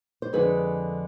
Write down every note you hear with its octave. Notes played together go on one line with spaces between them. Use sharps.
C5
F2 D3 G#3 G#4 B4